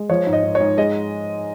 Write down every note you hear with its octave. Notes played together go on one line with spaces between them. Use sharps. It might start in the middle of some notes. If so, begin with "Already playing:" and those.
Already playing: G#3
F3 C#5
G#2
D#5
G#2
C#5
G#2
G#3 D#5